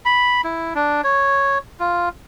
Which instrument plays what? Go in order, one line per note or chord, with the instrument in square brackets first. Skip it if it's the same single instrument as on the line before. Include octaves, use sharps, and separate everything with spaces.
[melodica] B5
E4
D4
C#5
F4